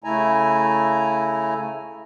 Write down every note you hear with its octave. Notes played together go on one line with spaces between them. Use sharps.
C#3 A3 E4 G#5 A#5